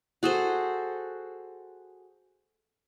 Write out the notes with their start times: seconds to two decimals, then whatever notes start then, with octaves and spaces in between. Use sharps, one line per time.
0.23 F#4 G#4 A4 C5